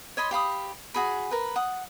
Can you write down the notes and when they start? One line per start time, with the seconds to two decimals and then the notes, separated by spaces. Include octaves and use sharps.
0.17 C#5 D#5 B5 C6
0.31 G4 F5 B5 D#6
0.94 F#4 G#4 B5
1.31 A#4 B4
1.56 F#5 D#6